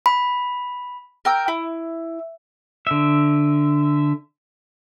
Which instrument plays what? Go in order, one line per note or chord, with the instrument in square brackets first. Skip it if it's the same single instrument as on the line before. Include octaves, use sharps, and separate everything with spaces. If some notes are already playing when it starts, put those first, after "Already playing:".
[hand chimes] B5
[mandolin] A#4 G5 E6
E4
[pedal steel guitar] D3 E5